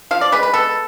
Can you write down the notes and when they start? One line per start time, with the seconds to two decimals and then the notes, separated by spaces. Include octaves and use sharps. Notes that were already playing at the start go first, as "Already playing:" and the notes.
0.11 F3 F5
0.21 D5
0.32 G#3 B4
0.43 B4
0.54 B3 A4